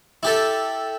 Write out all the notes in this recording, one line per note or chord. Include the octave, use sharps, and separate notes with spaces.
E4 G4 A4